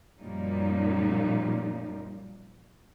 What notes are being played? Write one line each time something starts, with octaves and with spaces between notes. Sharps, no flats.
F#2 A#2 F3 G3 A#3 D#4